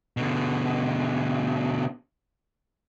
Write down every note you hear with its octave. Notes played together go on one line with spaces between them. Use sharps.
B2 D3